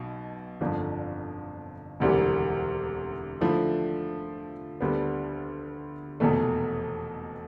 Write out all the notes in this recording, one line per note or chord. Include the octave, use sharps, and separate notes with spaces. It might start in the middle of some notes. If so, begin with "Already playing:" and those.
Already playing: B1 B2
G1 F2 D3 F3
E1 D2 C3 E3 G3
D3 F3 A3 E4
D2 D3 G3 B3
F1 E2 B2 A3